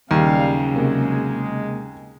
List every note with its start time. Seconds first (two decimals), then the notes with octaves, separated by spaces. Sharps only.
0.11 D#2 C#3 F#3 G3 F5
0.75 C3 G#3 A#3